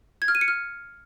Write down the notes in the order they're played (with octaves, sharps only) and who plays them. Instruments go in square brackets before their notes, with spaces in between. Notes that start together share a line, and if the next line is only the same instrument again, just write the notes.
[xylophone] G#6
F6
D#7
C#7
F6